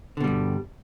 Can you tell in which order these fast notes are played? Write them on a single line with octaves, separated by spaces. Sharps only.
D3 B2 G3 G2